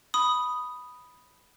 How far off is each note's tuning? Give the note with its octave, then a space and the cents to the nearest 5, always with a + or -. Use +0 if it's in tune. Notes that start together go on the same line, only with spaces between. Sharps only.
B5 +0 D#6 +0